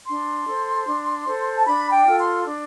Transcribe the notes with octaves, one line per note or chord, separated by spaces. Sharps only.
D4 C6
A4 C5
D4
A4 C5
A5
D4 B5
G5
F4 A4
C6
D4